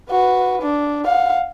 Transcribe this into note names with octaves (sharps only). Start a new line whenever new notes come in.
F#4 B4
D4
F5 F#5